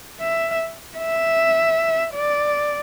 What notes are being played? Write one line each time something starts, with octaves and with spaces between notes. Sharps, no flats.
E5
E5
D5